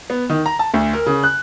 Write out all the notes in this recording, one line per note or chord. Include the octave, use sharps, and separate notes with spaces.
B3
D#3
A#5
A5
D2
A#4
C#3
F#6